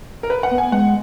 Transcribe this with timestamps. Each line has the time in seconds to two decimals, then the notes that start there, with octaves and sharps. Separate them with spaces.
0.23 A#4
0.30 B4
0.43 F#5
0.51 B3
0.58 G#5
0.72 G#3 F#5